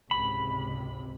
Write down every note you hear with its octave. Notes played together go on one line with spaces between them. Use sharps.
G#1 C#2 C3 B5